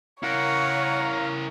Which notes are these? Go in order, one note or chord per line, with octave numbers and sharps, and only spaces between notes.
E4 A#4 C#5 F5 F#5 A#5